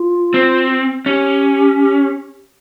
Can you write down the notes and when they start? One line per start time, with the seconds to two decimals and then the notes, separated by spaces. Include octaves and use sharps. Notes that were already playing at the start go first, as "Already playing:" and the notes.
Already playing: F4
0.34 C4
1.06 C#4 G4